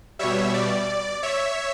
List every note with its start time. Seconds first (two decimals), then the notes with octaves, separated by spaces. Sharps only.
0.19 B2 G3 C#5 E5
0.54 D5
1.23 C#5 E5